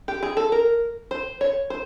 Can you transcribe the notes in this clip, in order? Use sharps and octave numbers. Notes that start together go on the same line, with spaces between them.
G4
G#4
A4
A#4
C5
C#5
C5